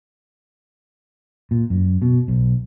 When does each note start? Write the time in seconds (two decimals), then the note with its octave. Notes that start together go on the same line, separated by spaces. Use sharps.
1.51 A#2
1.70 F#2
2.02 B2
2.28 B1